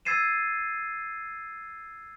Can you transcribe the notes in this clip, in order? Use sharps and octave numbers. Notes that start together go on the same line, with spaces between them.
E6 G#6 A6 C7 D#7 E7